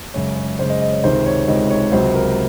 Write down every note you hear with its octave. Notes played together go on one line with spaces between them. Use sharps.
F#2 C#3 G#3 C#5
C#5
F#2 C#3 G#3 C5
D#5
D#5
C#5
C#2 C3 D#3 G#3 C5
C#5
C#2 C3 D#3 G#3 D#5
C#5
C#2 C3 F#3 C5
A#4